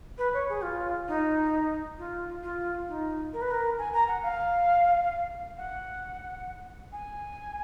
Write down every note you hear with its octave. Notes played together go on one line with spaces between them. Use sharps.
B4
C#5
G#4
F4
D#4
F4
F4
D#4
A#4
B4
A#4
G#5
A#5
F#5
F5
F#5
G#5